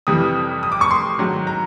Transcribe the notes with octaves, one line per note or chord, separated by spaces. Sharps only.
F2 C3 E3 G3 D#6
D#6
D6
C#6
C6
G#2 D#3 F#3
A#5